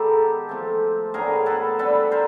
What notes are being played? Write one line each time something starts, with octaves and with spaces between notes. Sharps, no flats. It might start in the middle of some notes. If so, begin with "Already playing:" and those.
Already playing: D#3 G#3 B3 G4 A4
F3 A3 C4
A2 F#3 B3 D4 G#4 A#4
A4 B4
D3 G3 C4 A4 B4
A#4 C5